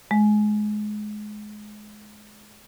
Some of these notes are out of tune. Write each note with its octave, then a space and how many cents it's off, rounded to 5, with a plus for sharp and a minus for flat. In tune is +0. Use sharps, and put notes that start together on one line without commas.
G#3 +25